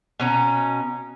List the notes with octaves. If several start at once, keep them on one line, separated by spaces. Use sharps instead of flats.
B2 C#4 A#5